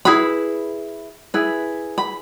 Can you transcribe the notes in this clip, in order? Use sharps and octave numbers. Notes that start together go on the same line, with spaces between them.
E4 G#4 B4 B5
E4 G#4 B4
B5